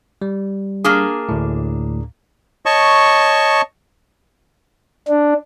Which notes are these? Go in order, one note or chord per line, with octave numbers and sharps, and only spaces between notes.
G3
A#3 D4 G#4
D2 A2
C#5 D#5 A5 C#6
D4